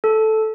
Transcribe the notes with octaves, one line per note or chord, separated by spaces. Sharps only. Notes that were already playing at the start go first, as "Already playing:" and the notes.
A4